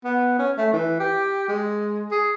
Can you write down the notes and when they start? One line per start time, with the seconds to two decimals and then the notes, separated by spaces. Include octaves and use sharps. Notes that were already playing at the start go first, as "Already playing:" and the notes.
0.04 B3
0.39 C#4
0.58 A3
0.73 E3
1.00 G4
1.48 G#3
2.11 G#4